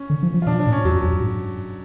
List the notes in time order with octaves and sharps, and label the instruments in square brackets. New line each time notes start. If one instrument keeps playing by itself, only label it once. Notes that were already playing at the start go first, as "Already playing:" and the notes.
Already playing: [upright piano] C#4
[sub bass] D3
F3
F3
[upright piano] F4
[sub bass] B2 [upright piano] D4
[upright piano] D4
[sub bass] A2
[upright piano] C#4
[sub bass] F2 [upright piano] F#3
[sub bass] F#2
F2
F#2
G#2